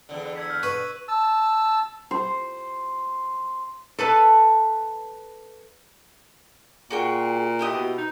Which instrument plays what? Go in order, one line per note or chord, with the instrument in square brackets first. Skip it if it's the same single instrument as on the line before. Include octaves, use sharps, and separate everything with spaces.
[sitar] E2 D3
[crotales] E6 G#6 B6
[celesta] F6 [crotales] F#6 B6
[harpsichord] B4 [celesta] C#6 [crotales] D#7
[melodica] A5 E6
[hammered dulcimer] C5
[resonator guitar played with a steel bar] A4 B4 A5
[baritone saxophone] A#2 [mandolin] F#4 G#4 G5
[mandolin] E4 G4 D#5
[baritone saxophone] B2
D#4